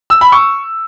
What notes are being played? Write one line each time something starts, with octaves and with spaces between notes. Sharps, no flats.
E6
B5
C#6